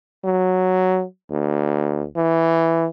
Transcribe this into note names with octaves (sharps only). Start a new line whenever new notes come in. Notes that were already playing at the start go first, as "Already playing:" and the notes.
F#3
D2
E3